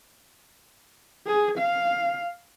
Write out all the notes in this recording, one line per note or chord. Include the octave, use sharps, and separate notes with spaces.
G#4
F5